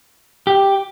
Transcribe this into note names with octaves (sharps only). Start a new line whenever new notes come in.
G4